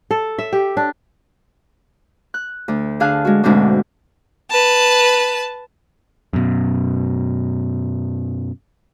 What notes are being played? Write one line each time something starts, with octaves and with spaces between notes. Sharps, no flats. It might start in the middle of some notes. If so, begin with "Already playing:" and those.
A4
E5
G4
D4
F#6
D2
D3 D4 G#4 F5 A5 F#6
G#3 F#4
D2 G#2 B2 G#3 C4 D4
B4 A5
F#2 B2